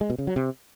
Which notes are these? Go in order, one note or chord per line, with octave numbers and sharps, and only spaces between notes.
G#3
B2
C#3
F#3
C3